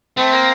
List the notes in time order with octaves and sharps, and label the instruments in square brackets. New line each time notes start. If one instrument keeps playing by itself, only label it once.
[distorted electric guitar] A3 [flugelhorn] C4
[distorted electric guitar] A#3